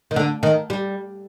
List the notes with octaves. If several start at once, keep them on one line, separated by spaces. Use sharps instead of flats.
D#3
D3
D#3
G3